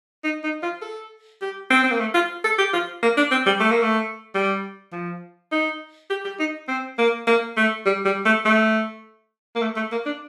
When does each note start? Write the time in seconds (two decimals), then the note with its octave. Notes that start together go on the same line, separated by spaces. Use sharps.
0.24 D#4
0.43 D#4
0.63 F4
0.82 A4
1.41 G4
1.70 C4
1.84 C4
1.91 A#3
2.00 A3
2.14 F4
2.44 A4
2.58 G4
2.73 F4
3.03 A#3
3.17 D4
3.31 C4
3.46 G3
3.60 A3
3.71 A#3
3.82 A3
4.35 G3
4.92 F3
5.52 D#4
6.10 G4
6.25 G4
6.39 D#4
6.68 C4
6.98 A#3
7.27 A#3
7.57 A3
7.86 G3
8.05 G3
8.25 A3
8.45 A3
9.56 A#3
9.62 A3
9.76 A3
9.92 A#3
10.06 D4